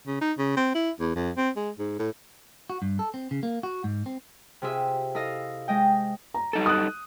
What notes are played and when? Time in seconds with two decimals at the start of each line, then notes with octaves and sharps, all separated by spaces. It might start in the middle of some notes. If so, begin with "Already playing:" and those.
0.07 C#3
0.21 D#4
0.38 C#3
0.57 C4
0.75 E4
1.00 E2
1.16 F2
1.37 C4
1.57 G#3
1.79 G#2
1.99 A2
2.70 F#4
2.82 G2
2.99 A4
3.14 C4
3.31 C#3
3.43 A#3
3.63 F#4
3.84 G#2
4.06 C4
4.62 C3 F4 G#4 E5
5.15 E4 A4 D#5 F5
5.68 G#3 D#5 G5
6.34 A#5
6.53 G3 D#4 A4
6.66 D#6 F#6